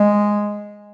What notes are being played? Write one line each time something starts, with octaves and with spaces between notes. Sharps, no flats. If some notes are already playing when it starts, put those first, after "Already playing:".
Already playing: G#3